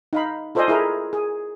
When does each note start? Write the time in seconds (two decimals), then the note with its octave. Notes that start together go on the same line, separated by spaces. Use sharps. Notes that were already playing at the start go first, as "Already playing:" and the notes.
0.13 D#4 F5 B5
0.55 F4 A4 C5 D5 D#5 G#5
0.68 E4 G#4 A#4
1.13 G#4